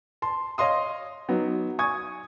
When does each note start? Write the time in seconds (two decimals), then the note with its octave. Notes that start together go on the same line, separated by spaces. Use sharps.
0.22 A5 C6
0.58 C#5 D#5 F5 C6 D#6
1.29 F#3 B3 D#4
1.79 G#5 C#6 D#6 G#6